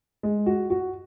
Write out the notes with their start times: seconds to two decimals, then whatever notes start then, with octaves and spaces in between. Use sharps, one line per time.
0.23 G#3
0.46 F#4
0.70 F#4